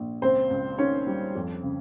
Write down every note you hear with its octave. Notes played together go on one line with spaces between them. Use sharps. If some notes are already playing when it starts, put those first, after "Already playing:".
Already playing: A#1
C#2 C4 C5
C#2
D#3 C#4 C#5
G3
F2
C#3